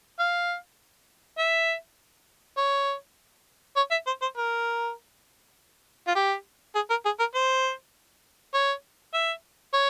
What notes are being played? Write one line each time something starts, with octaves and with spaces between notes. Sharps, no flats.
F5
E5
C#5
C#5
E5
C5
C5
A#4
F4
G4
G#4
A#4
G#4
A#4
C5
C#5
E5
C#5